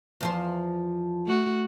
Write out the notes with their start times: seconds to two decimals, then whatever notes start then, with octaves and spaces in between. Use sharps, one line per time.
0.21 E2 F3 C5
1.26 A3 F#4